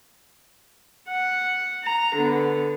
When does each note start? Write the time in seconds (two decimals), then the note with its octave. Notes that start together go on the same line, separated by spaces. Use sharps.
1.08 F#5
1.84 A#5
2.15 D3 B3